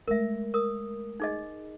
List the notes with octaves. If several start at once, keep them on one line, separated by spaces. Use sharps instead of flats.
G#3 A3 A#4 E5
A#4 D#6
D#4 G#4 D#5